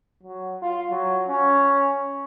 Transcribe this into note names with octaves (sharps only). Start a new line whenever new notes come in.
F#3
F4
F#3
C#4